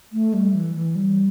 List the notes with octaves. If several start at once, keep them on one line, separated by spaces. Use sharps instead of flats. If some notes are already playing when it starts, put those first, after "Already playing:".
A3
G3
E3
E3
G3